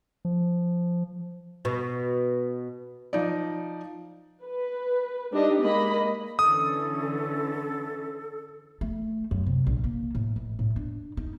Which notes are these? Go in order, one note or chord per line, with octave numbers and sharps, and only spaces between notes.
F3
B2
F3 D#4 D5
B4
G3 D4 D#4 G4 D#5
G#3 A#3 D#5 B5
D3 E3 C#4 A4 D#6
A3
F#2
C3
A#1
A#3
A2
A1
A2
D4
D#4